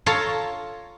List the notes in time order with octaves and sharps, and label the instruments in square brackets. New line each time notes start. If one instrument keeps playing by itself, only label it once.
[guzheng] F4 A4 C#5 F5 A5 A#5